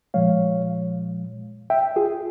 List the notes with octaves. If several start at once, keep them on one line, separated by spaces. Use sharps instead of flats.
A#2 F3 G#3 C#5 F5
E5 G5
F4 G#4